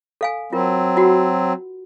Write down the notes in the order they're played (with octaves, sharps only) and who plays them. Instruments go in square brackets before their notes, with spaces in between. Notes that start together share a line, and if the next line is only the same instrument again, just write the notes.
[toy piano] A4 F5 G#5
[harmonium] F#3 C4 [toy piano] F4 A#4
[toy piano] F4 F#4 F#5